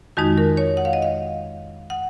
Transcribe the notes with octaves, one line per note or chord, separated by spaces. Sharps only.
F2 D#3 G#3 D#4 F#4
A#4
C#5
F#5
F5
D#5
F5
F#5